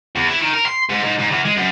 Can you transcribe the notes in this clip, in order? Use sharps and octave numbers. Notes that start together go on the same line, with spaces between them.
E2
E3
D#3
A#4
C6
G#2
G#2
G#2
E2
G#3
F#2